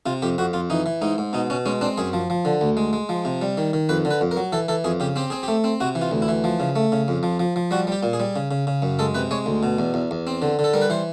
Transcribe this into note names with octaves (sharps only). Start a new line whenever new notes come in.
C3 F4
F2 G4
F2 F#4
F2 F4
E3 D#4
E3
G#2 D#4
G#2
B2 D#4
B2 C#4
G#3 C#4
C4 D4
F#2 G#4
F3
F3
D3
D2
G#3
G#3
F3
C3
G3
D#3
D#3
F2 B4
D3
B4
F2
A#4
F#3
E3 A4
E3 A4
F2 G#4
C#3 G4
C4 G4
C4 G#4
A3 G4
C4
C3 F#4
E3
F4
D2
E4
E3
F3
C#3
A3
C#3
F2
F3
F3
F3
G3 F#4
G3 G4
A#2
G#4
G3
C#3
C#3
C#3
F#2
G#3 A4
C3 B4
G#3 C#5
D2
B2
E2
E2
E2
C4
D3
D3
A4
G3 A#4
B4
E3 C5